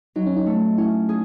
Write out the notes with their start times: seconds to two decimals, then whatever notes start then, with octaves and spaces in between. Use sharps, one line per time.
0.16 F#3 D#4
0.27 C#4
0.37 D#4
0.46 A3
0.78 C#4 E4
1.09 G#4